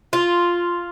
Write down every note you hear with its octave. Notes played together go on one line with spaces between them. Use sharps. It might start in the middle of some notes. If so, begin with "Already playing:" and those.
F4